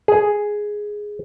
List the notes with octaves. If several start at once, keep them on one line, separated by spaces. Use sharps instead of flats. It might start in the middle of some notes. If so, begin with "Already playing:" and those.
G#4